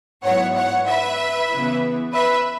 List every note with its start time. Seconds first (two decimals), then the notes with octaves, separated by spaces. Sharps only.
0.24 G#2 F#3 B3 E4 C#5 F#5
0.56 C#5 F#5
0.87 B4 E5
1.51 C#3 E3 B3 E4
2.13 B4 E5